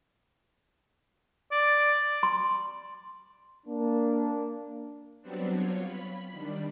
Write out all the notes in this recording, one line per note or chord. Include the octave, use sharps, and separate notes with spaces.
D5
C6
A#3 D4
F#3 G3 B3 C4 D4
F4 C#5
B5
D#3 G3 D4